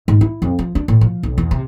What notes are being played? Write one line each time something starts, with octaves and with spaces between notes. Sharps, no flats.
G#2
E4
F2
F3
D4
A2
F3
B1
E2
C3